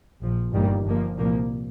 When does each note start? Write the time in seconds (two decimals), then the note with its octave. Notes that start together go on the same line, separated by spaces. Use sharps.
0.21 A#1 A#2 F3
0.52 G1 G2 D#3 G3 A#3
0.84 G1 G2 F3 A#3
1.17 C2 A#2 F3 A#3